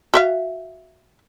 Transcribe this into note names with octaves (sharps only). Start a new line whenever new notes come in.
F#4 E5 F5